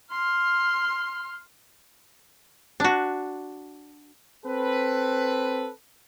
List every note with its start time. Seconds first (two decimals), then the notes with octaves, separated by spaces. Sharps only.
0.12 C6 F6
2.80 D4 F#4
4.45 C4 A4 B4